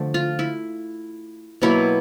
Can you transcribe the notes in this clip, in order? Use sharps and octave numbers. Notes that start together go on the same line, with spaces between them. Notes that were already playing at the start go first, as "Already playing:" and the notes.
Already playing: D3 F3 A3
F4
E4
B2 F#3 A#3 E4